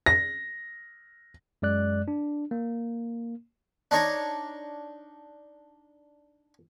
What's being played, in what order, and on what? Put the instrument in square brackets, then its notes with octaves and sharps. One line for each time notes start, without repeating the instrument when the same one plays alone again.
[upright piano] A#6
[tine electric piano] F#2 G#3 D5 F#6
D4
A#3
[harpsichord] D4 D#4 C#5 A#5